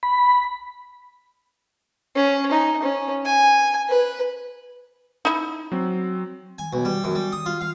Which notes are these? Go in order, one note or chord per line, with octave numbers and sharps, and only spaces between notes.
B5
C#4
D#4
C#4
G#5
B4
D#4 E4
F#3 C4
G#5
B1
G3
F#2
G3
D#6
F4
F5